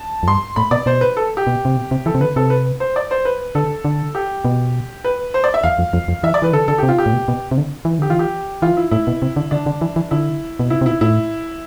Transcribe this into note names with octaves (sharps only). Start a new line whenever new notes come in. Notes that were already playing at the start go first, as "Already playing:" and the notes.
Already playing: A5
F2
G2 C6
A2 B5
B2 D5
B2 C5
B4
A4
G4
B2
C3
B2
C3
E3 A4
C3
D3 B4
C3 A4
B4
C5
D5
C5
B4
D3 A4
D3
G4
B2
B4
C5
D5
E5
E2 F5
F2
F2
F2
E3 E5
D5
E3 B4
D3 A4
D3 A4
C3 G4
F4
G4
A2
B2
B2
C3
D3
E3
D3 G4
E3 F4
G4
E3 F4
E4
A2 E4
B2
C3
D3
D3 D4
D3
E3
E3
D3 E4
B2
C3 E4
C3
B2 E4
A2 E4